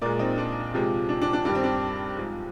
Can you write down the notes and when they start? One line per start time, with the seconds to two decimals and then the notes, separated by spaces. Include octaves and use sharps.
0.02 A#2 G#3 A#4 D5
0.19 C4 D#4
0.38 D4
0.74 C3 F3 G#3
1.09 D4
1.22 D4
1.33 D4
1.45 G2 D#3 G3 D4
1.55 C4
1.63 D4
2.17 G#2 F3 G#3